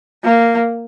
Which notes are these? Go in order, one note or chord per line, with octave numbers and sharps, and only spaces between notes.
A#3